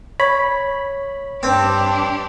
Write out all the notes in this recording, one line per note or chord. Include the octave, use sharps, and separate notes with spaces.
C#5 B5
G2 C4 D4 G4